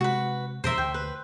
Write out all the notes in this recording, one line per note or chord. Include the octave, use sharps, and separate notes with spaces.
C3 G#3 F#4 B4
F2 B2 E3 A#4 C5 E5 C6
D2 G5
B4